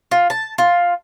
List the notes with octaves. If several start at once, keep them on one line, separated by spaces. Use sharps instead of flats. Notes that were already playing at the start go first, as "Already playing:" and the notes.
F4
A5
F4